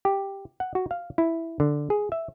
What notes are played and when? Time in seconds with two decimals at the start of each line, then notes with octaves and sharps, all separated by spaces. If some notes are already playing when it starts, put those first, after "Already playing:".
0.05 G4
0.60 F#5
0.75 F#4
0.91 F5
1.18 E4
1.60 D3
1.90 G#4
2.12 E5